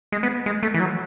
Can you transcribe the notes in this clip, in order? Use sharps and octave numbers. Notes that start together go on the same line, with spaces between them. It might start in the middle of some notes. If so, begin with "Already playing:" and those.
G#3
B3
G#3
A3
E3
F#3